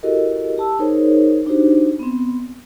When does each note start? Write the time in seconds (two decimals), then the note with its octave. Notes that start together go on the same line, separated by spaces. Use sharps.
0.03 E4 F#4 G4 A4 A#4 D#5
0.58 G4 A5 E6
0.79 D#4 G#4 A#4 C5 C#5
1.46 D4 D#4 F#4 G4 C5
1.99 B3 C4